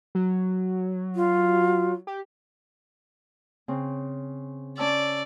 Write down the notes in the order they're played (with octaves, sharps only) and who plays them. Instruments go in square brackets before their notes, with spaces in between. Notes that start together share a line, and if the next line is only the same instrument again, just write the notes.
[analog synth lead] F#3
[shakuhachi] F4
[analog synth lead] G4
[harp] C#3 C4
[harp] C#4 A5 E6 [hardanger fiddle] D5